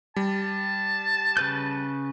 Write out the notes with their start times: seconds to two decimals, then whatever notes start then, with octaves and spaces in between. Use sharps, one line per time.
0.16 G3 A5
1.37 C#3 B4 G6